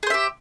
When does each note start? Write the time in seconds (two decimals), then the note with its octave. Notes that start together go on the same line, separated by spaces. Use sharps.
0.03 G#4
0.07 C5
0.10 E5
0.14 G4